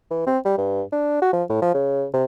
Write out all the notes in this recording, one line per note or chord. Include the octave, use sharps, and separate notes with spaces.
E3
C4
G3
G2
D4
F#4
F3
A2
F3
C#3
C3